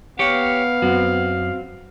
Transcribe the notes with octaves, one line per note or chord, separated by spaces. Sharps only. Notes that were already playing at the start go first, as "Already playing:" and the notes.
B3 G4 C#5 F5
F#2 C4 F#4